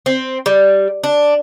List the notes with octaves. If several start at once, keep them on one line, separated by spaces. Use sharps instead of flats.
C4
G3
D4